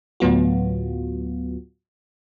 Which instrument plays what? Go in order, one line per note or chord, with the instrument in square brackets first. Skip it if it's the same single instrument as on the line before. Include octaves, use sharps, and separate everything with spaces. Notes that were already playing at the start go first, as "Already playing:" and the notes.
[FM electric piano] D2 A2 F#3 B3 F4 F#4